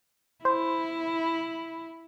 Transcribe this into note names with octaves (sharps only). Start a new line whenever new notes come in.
E4 C5